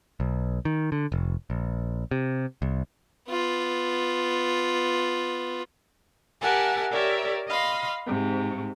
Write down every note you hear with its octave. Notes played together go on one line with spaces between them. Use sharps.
B1
D#3
D3
F1
A#1
C3
C2
B3 F4
G4 A#4 E5 F#5 G#5 A5
G4 A#4 C#5 D5 E5
D#5 F5 B5 C6
G#2 C3